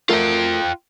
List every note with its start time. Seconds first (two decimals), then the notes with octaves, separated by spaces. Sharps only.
0.09 A3 F4 F#4 A#4 G5